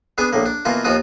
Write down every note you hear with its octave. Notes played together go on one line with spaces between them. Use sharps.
B3 D4 G#4 G#5
A#1 A2 A#3
D4
B2 E3 A#3 F4
D#2 D#3 F3 F4 F#4 D#6